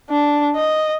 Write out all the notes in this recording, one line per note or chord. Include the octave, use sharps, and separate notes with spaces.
D4
D#5